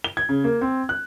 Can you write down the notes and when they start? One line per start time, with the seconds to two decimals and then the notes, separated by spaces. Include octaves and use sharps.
0.04 G7
0.17 G#6
0.29 C#3
0.44 A#3
0.61 C4
0.89 F#6